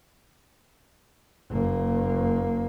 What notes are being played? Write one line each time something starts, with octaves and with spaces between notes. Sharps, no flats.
F#1 A#3